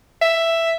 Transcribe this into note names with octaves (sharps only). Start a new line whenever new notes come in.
E5